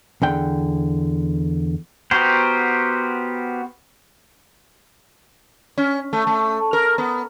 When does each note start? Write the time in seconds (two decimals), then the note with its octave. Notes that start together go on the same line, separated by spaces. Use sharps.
0.22 E2 D3 G5
2.11 B3 F#4 G4 A#4 C5
5.78 C#4
6.13 A3
6.27 A3
6.73 A#4
6.98 B3